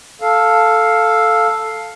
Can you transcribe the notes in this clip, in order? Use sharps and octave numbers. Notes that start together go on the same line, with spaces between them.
A4 F5